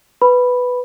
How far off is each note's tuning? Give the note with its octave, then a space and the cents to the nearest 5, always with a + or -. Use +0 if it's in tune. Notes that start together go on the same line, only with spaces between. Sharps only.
B4 +5 B5 +0